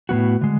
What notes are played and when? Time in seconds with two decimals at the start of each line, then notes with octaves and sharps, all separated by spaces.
0.09 A2 G#3 B3 F#4
0.41 D3 G#3